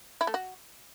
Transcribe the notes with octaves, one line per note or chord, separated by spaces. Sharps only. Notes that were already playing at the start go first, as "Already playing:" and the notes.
E4
A3
F#4